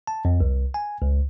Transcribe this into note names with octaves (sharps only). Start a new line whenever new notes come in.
A5
F2
C2
G#5
C#2